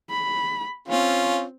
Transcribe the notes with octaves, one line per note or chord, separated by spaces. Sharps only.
B5
C4 C#4 F4